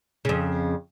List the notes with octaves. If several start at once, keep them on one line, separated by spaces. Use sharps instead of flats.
F2 C#3